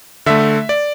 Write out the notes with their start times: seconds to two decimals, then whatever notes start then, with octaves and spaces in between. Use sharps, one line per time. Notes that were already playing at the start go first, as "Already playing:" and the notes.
0.26 D3 A3 E5
0.69 D5